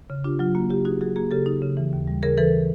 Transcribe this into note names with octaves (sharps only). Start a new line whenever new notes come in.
C#3
D4 F4 G4
F#3 F4
A#3 F#4
C#3 F4 G4
D#4 F#4 G#4
F#3 F#4 G#4
A#3 F#4 G#4
C#3 G4 A4
D#4
C#3
E3
D#2
G3
C#3 G#4 A#4
E3 A4 B4